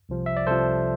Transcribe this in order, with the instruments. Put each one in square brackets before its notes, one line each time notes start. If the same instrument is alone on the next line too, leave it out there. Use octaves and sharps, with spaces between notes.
[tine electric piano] C2 C3 F3
E5
D5
C2 C3 F3 A4 C5